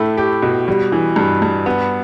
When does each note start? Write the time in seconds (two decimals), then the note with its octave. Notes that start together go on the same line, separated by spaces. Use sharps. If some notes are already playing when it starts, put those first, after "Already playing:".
Already playing: A2 A3 E4
0.17 G4
0.42 B2
0.68 G3
0.92 E3
1.16 G2
1.42 G2
1.66 B3